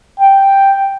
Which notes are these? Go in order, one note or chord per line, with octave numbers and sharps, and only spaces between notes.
G5